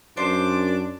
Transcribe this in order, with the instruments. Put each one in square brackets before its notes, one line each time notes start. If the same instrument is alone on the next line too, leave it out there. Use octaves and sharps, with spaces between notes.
[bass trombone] F#2 [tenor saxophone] D4 [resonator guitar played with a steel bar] C5 [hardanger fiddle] D6